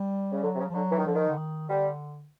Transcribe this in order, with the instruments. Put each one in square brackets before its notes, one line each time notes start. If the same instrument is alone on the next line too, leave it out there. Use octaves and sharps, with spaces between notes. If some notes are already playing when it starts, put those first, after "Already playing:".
Already playing: [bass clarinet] G3
[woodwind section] C#3
[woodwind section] D3 [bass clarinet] F#3
[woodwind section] C3
C#3
[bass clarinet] F3
[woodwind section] D3 [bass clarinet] F#3
[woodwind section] E3
D#3
[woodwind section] D3 [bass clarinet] F3
[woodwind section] D#3
[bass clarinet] D3
D#3
[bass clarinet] D3 [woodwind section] G3